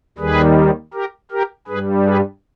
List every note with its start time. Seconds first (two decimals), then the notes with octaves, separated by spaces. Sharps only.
0.18 D#2 D#3 G3 G#4 B4
0.94 G4 A#4
1.31 G4 A#4
1.68 G2 G3 G#4 B4
2.05 G#4 B4